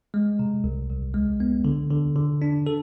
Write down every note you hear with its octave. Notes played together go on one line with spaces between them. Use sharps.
G#3
C3
C2
C2
G#3
B3
D3
D3
D3
D4
A4